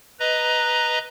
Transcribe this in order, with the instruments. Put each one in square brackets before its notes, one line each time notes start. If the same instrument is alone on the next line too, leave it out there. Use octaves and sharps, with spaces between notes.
[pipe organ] B4 D#5 A#5